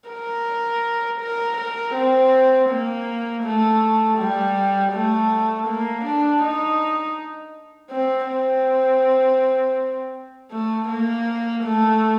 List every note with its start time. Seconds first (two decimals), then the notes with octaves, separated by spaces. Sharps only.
0.09 A#4
1.21 A#4
1.58 A#4
1.94 C4
2.69 A#3
3.44 A3
4.18 G3
4.93 A3
5.67 A#3
6.05 D4
6.42 D#4
7.91 C4
8.29 C4
10.52 A3
10.89 A#3
11.64 A3